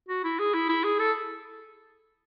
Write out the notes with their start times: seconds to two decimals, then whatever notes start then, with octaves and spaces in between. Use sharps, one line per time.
0.09 F#4
0.24 E4
0.39 G#4
0.54 E4
0.69 E4
0.84 G#4
0.99 A4